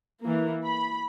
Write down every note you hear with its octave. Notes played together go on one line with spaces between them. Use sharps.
E3 A#3
B5